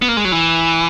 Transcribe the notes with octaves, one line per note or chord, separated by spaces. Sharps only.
B3
A#3
G#3
F#3
E3